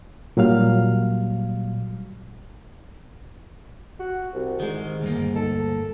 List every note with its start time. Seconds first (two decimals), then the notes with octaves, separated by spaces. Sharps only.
0.37 A#2 F#3 G3 F5 F6
4.00 F#4
4.34 C2
4.60 G#2 D#3 G#3
5.01 D2 G2 A#3
5.36 A4